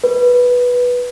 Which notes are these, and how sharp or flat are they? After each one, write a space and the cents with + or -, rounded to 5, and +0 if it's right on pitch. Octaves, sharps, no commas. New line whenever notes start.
B4 -5